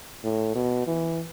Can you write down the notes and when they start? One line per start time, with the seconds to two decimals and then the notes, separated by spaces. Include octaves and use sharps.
0.24 A2
0.55 B2
0.87 E3